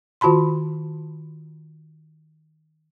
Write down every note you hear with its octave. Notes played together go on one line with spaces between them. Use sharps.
D#3 F4 F#4 A5 B5 C6